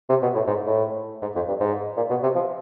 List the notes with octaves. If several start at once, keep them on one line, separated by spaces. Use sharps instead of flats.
C3
B2
A2
G#2
A2
G#2
F2
G2
G#2
A#2
B2
C3
F3